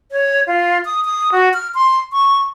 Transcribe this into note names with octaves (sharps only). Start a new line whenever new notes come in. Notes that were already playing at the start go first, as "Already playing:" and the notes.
C#5
F4
D#6
D#6
F#4
F6
C6
C#6